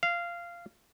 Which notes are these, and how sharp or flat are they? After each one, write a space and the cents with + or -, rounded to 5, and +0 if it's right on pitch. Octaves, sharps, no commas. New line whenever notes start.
F5 -15